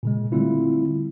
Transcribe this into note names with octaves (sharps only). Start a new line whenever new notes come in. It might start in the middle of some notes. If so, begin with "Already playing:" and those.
A#2 C#3 G#3
D3 G3 A3 C4 E4 F4